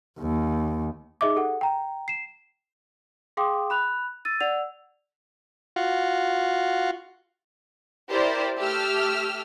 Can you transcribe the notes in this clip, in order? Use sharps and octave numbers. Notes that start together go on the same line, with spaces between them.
D#2
D#4 G#4 D#5 E5 D6
G4 A4 F#5
G5 A#5
C7 E7
G#4 F5 G5 C6 D6 D#6
B5 F#6 F7
E6 A6 D#7
D5 F#5 E6 F7
F4 F#4
E4 G4 A#4 C5 D5
A3 G4 E6 F6